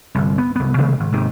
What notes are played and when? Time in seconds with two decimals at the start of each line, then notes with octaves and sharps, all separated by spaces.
0.15 G1 C2
0.38 B3
0.56 C2 B3
0.78 C3 D#3 G#3 A3
1.00 G#1
1.12 G#2 C3 D#3